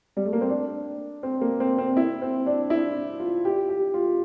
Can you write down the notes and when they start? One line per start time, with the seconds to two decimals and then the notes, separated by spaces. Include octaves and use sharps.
0.17 G3
0.25 A3
0.33 A#3
0.41 C4
0.50 D4
1.23 C4
1.41 A#3
1.60 C4
1.78 C4
1.97 E4
2.22 C4
2.46 D4
2.70 E4
3.20 F4
3.45 G4
3.69 G4
3.94 F4